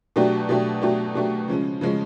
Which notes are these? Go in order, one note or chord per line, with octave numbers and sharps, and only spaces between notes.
B2 F#3 A3 D4 G4
B2 F#3 A3 D4 G4
B2 F#3 A3 D4 G4
B2 F#3 A3 D4 G4
C#3 F3 G#3 C#4
C#3 F3 G#3 C#4